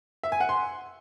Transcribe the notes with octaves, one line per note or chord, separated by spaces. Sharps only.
E5
G#5
F#5
C6